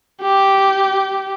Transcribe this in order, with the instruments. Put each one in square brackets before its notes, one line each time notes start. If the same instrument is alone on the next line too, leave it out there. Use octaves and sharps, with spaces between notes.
[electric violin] G4